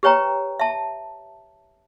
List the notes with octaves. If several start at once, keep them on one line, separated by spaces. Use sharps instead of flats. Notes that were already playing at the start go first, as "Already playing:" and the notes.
G4 B4 C#5 G5 A#5
E5 A5